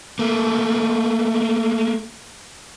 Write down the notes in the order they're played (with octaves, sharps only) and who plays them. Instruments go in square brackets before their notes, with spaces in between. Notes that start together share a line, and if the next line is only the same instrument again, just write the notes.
[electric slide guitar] A3 A#3